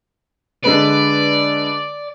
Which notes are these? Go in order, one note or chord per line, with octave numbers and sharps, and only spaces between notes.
D3 G#3 B4 D5